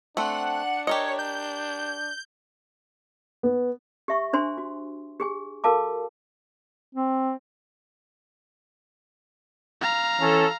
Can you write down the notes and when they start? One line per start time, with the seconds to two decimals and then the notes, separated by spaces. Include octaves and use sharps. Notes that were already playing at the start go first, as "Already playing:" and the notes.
0.17 A3 C4 D4 F#5
0.87 G4 A#4 C#5 D#5
1.19 G6
3.43 B3
4.08 G4 E5 C#6
4.33 D4 C5 G#5 C6
4.58 F#4
5.20 G4 G#4 G#5
5.64 F#4 A4 A#4 F5 A5 D6
6.95 C4
9.81 F5 A#5
10.20 E3 C#4 A4